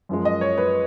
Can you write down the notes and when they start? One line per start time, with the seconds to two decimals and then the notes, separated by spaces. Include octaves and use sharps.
0.09 F#2 F3 G#3
0.25 D#5
0.41 C#5
0.58 B4